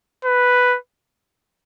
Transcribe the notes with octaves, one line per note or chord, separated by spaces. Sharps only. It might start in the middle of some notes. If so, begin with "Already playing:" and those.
B4